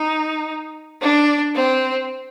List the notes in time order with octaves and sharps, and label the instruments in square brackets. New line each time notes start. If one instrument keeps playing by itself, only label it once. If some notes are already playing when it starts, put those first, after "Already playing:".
Already playing: [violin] D#4
D4
C4